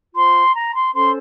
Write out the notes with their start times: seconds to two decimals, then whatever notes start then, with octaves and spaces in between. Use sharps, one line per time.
0.15 F4 C5 C6
0.54 A#5
0.74 C6
0.94 C#4 A4 C5 C6